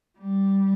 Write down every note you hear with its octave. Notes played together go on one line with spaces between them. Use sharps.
G3